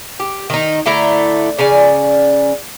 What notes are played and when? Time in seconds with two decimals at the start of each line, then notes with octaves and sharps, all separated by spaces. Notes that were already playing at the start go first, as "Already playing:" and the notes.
0.20 G4
0.50 D#3 D#4
0.86 D3 A3 E4 A#5
1.59 C#3 C#4 D5 G#5